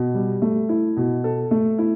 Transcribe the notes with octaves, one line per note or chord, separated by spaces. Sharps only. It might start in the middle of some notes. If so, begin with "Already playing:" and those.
Already playing: B2
G3
A3
E4
B2
A4
A3
E4